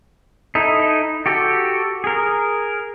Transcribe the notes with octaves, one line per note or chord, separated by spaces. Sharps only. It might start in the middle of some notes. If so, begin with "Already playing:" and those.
D#4 E4 A4
F#4 G4 A4
G#4 A#4